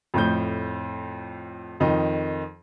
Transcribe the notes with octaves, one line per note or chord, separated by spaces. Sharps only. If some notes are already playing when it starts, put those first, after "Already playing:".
F2 A2 G6
F2 D#3 D#4